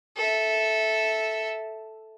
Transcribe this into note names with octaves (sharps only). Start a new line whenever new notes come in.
A4 E5